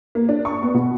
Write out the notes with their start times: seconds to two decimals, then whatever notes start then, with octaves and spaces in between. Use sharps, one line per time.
0.15 A#3
0.29 D4
0.45 C#6
0.62 B3
0.74 B2